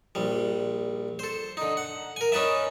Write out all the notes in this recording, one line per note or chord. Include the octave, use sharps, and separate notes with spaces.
A#1 G3
A4 C5
D3 D#4
F#5
A#4 G#5
C#4 D#4 B4 D5 E5